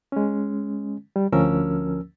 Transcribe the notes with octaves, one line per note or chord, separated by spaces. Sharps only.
G#3 C#4
G3
D2 F3 C#4 A#4 E6